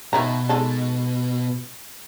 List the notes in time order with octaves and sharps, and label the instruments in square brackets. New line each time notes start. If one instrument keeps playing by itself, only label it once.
[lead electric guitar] B2 [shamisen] D#3 E4 A#5
[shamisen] G#3 D#4 A4